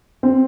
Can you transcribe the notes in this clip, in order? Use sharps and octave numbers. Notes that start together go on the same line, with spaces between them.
C4